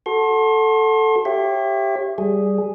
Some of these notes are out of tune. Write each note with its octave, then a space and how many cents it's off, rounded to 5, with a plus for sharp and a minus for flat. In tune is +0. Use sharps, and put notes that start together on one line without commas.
F#4 +0 A4 +0 C6 +35
G4 +0 C#5 -30 E5 +20
G3 +0 G#4 +0